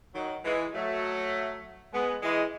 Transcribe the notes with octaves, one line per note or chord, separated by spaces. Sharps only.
D#3 F#3
E3 G#3
F#3 A3
G#3 B3
E3 G#3